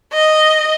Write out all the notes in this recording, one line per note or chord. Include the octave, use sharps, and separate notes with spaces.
D#5